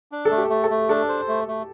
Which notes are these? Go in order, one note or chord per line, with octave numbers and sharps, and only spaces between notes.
D4
A4
A3
G4
A3
A4
A3
D4 A4
C5
A3
A3